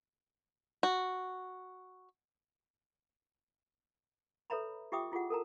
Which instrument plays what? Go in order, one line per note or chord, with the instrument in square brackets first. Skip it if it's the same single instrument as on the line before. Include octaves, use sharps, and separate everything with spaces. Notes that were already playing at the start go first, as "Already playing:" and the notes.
[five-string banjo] F#4
[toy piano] A4 B4 C#5 E5 A#5 B5
F4 G4 E5 G5 D6 D#6
E4 F4 G4 G#4 F#5
A4 A#4 A5 A#5